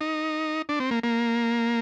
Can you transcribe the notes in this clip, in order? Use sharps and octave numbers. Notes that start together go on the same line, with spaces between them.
D#4
D4
C4
A#3
A#3